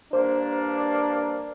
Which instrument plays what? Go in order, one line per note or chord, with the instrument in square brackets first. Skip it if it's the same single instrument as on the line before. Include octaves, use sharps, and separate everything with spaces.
[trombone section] G2 A#3 D4 [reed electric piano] C5